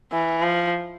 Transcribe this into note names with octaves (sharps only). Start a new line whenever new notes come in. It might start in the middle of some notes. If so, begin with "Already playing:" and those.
E3
F3